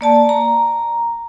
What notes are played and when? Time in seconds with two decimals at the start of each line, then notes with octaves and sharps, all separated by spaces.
0.01 A#3 D5 A5
0.29 A#5